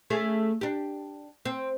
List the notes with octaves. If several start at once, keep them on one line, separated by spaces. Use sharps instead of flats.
A3 C#4 G#4
D4 G4
C4